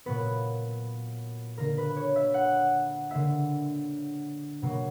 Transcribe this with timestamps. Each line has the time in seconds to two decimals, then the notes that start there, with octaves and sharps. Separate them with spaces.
0.06 A#2 F#3 B3 B4
1.58 D3 A#3 A#4
1.78 B4
1.97 C#5
2.16 E5
2.34 F#5
3.10 D3 A#3 E5
4.62 B2 F#3 A#3